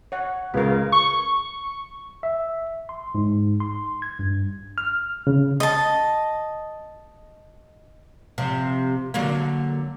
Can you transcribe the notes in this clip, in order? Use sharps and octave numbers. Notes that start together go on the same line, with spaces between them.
C#5 F#5
C#2 C#3 A#4 B4
C#6
E5
C6
G#2
C6
G#6
G2
F6
C#3
D#5 A5
C3 F3
D3 F#3 A#3